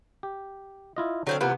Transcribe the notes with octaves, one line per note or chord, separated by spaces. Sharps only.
G4
E4 F4 D#5
D3 F#3 C4 F5
C3 E3 A#3 B3 F4